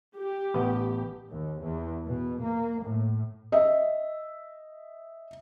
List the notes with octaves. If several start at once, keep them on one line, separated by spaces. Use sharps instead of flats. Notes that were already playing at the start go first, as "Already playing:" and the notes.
G4
A1 B3
D#2
E2
B2
A#3
A2
D#5 E5